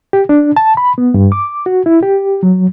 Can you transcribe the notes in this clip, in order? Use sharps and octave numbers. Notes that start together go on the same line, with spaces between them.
G4
D4
A5
B5
B3
G2
D6
F#4
E4
G4
F#3